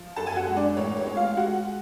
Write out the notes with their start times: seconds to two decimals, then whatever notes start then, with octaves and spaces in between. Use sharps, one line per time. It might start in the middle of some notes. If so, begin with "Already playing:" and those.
Already playing: F3
0.16 F#2 A4 A5
0.27 G#5
0.36 F#4 F#5
0.47 G#3
0.56 D4 D5
0.77 A1 C#5
0.97 C#5
1.06 G#3
1.17 F4 F5
1.37 G#3 F#4 F#5